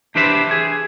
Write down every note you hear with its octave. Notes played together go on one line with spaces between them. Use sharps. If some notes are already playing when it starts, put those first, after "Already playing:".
E3 D4 G4 B4 C5 E5
G#4